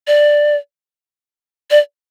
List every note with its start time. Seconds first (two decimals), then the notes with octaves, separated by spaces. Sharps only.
0.07 D5
1.71 D5